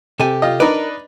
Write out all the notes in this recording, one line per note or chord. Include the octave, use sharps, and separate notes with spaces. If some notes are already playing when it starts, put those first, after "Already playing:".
C3 G4 A4 G#5
F4 G4 D#5
D4 D#4 A#4 B4 D5